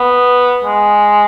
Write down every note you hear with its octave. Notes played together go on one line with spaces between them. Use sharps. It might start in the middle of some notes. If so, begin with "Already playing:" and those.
Already playing: B3
G#3